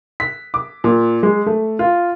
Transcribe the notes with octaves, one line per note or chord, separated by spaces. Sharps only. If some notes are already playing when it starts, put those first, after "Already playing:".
B6
D6
A#2
G#3
A3
F4